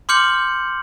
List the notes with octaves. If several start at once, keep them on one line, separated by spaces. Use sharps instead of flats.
C6 D6 F6 G6 C#7 F#7